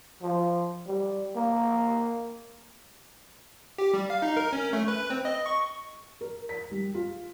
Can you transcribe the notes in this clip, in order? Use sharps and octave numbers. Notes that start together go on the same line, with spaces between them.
F3
G3
A#3
G4
G3
F5
D#4
A#4
C#4
A3
B4
C4
D#5
C#6
A#4
B6
G3
F4